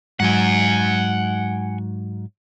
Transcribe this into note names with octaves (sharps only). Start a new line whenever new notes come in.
G#2 F#3 F#5 G#5